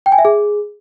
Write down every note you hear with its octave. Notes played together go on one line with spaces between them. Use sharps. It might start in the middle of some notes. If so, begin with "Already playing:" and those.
G5
G#5
E5
G#4